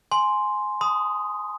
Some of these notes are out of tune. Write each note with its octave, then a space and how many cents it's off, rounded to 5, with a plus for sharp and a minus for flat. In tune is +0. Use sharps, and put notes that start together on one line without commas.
G#5 +10 C6 +0
A5 +40 C6 -35 D#6 +0